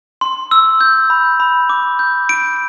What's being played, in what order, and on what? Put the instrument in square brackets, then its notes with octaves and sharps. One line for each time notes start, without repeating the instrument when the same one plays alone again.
[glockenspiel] C6
E6
G6
B5
B5
D6
G6
D7